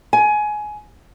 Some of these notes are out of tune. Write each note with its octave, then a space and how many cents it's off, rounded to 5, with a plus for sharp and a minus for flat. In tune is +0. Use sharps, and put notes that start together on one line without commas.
G#5 +20